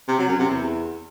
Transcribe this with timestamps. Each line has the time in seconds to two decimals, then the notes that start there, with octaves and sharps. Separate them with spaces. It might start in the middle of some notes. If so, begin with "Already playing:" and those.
0.08 C3
0.18 F#3
0.29 F#2
0.39 C3
0.50 E2